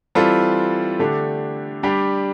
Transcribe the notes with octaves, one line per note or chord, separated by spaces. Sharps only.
E3 G3 C4 F4 A4
D3 A3 D4 G4
G3 D4 G4